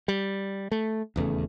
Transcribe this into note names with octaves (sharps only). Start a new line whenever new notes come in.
G3
A3
D#1 E2 C#3 A3